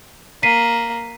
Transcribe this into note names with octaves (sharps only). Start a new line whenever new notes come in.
A#3 B6 C7 D#7